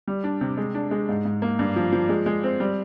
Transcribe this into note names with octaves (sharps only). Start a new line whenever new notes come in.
G3
D4
C3
G#3
D4
G#3
G#2
G#2
A#3
G2
F3
F3
G#3
G#3
C4
G3